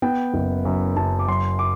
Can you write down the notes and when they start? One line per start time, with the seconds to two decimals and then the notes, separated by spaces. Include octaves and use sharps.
0.02 B3 G5
0.34 F#1
0.65 F#2
0.96 F#1 A5
1.19 D6
1.27 F#3 C6
1.59 D6